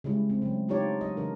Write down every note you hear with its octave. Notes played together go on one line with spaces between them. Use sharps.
C#3 G3 G#3 E4
C4
C#3 F#3 A3
D4 D#4 F4 G4 C#5 D5
F#3 D#5
C#3 E3 D4 A#4